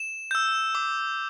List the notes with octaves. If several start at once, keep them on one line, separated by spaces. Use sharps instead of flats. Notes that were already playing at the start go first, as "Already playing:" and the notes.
Already playing: E7
E6 G6
D6